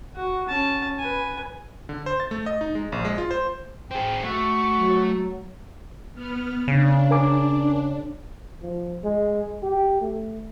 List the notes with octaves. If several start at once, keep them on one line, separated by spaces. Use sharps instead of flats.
F#4
C#4 A5
B4 G#5
D3
C5
A6
A3
D#5
D#4
G#3
A#1
G#3
F4
C5
C4 G#4 G5
A3 F#4
F#3
B3 F6
C#3 D4
A#4 G#5 D6
F3
G#3
G4
A3